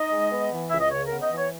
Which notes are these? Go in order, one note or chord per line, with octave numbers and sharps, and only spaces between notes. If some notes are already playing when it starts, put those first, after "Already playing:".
Already playing: D#4 D#5
G#3
B3
E3
C#2 E5
D#5
C#3 C#5
B3 A#4
D#5
E3
C#5